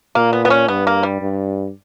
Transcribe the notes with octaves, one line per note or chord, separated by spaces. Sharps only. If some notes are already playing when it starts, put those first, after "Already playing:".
A#2 A#3
B3
B3
C#4
G2 B3
A#3
G3
G2